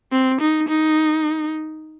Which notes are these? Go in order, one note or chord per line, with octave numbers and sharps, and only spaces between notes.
C4
D#4
D#4